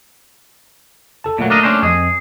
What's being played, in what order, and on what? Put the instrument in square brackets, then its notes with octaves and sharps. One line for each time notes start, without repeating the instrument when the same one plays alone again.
[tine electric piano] A4 A5
[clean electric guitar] A#2 F#3 [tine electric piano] A3 A#3
[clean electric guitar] D4 A#4 D#5
C#4 D4 C5
[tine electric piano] F2 C4 D#5 [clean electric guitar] G#4